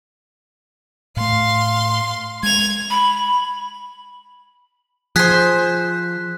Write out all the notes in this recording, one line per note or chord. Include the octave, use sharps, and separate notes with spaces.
A2 A3 F5 C6
G#3 G#6 F7
B5
F3 G#4 C5 F#6 B6